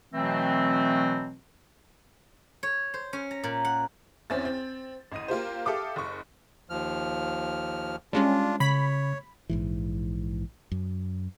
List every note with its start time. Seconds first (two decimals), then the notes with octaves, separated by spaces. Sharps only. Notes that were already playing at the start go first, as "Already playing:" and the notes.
0.13 B2 E3 F#3 A3 C4
2.63 C#5
2.94 C5
3.13 C#4
3.31 A#5
3.43 A#2
3.65 F#5
4.30 E2 C4 C#4 E4 A6
4.45 C4
5.12 A1 D#5 D#7
5.28 A#3 F4 G4 C5
5.65 G4 A4 E5 F5 D6 D#6
5.96 F#1 C#6
6.70 D#2 F3 F6
8.13 G3 G#3 C#4 D4 F4
8.60 C#3 C#5 B5 B6
9.50 A#1 G#2 E3
10.72 F#2